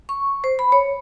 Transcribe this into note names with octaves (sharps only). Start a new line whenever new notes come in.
C#6
C5
B5
C#5